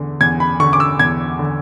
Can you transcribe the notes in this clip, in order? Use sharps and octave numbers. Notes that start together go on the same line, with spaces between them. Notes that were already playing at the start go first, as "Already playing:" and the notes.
Already playing: E2 D3
E2 G#6
B5
D3 C#6
D6
E6
E2 G#6
D3